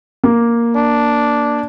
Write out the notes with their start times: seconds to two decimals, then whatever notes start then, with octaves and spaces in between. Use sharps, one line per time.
0.24 A#3
0.76 D4